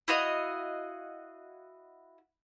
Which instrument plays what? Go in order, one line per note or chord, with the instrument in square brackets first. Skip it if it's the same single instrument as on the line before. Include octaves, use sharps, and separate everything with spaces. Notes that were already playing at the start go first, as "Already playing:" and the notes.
[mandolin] E4 F#4 D#5 F5